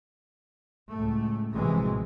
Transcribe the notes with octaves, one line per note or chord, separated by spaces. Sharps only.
C#2 A2 A3
A#1 A2 C3 E3 F#3 G#3